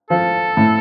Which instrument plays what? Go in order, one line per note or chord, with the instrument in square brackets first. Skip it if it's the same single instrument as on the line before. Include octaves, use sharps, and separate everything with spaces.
[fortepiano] F3 [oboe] A4
[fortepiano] A2